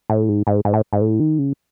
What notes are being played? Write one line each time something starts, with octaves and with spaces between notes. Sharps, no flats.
A2
G#2
G#2
G#2
A2
G#2
A2
D#3
C#3